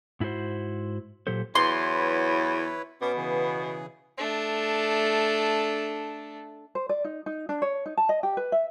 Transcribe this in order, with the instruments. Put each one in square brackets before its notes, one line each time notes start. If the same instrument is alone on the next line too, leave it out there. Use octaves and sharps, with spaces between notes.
[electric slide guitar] G#2 E4 F#4 G#4 C5
A#2 F#3 G4 A4 C5
[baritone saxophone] E2 [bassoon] F#3 [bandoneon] E4 B4 C#5 [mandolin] C6
[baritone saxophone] B2 [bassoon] B3 [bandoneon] C#4 D6
[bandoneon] C#3 E3 G#4
[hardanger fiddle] A3 D4
[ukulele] C5
D5
D#4
D#4
D4
C#5
D#4
A5
D#5
G4
B4
E5